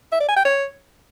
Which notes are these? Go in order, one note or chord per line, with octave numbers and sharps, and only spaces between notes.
E5
D5
G#5
G5
C#5